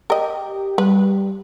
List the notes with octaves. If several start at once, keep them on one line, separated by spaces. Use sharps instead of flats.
G4 A#4 D#5
G3 B4